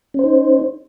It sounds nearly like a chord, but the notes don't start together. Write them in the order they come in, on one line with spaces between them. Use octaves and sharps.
C#4 C5 D#4